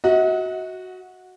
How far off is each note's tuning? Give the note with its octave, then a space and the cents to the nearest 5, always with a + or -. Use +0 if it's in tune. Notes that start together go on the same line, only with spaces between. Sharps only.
F#4 +0 D#5 +45 F#5 -15